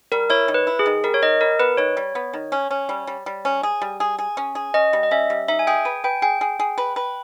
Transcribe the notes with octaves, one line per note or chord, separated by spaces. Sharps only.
G3 A#4
E4 C#5
D#3
B4
E4
G#4
D#3
G3 A#4
C#5
D#3 D#5
G3 A#4
B3 B4
D#3 C#5
G3
B3
D#3
C#4
C#4
G3
G3
G3
C#4
G#4
G3
G#4
G#4
C#4
G#4
C#4 D#5
G3
D#5
C#4 E5
G3
D#4 E5
G#5
G#4 G5
B4 G#5
B4 G5
G#4 G5
G#4
G#4
B4
B4